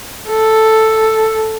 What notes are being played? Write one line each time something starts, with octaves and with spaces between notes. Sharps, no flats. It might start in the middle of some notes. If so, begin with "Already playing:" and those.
A4